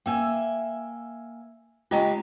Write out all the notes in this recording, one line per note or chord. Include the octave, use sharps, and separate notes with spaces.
A#3 E5 G5 G#5
C#3 G#3 F4 G4 D#5 A#5